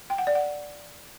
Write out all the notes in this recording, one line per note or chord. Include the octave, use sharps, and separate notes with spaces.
G5
F#5
D5
F#5